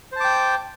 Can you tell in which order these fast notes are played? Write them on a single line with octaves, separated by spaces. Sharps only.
C5 A5 D6 G5